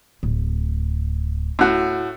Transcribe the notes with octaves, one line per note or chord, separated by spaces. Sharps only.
D1
A2 F#4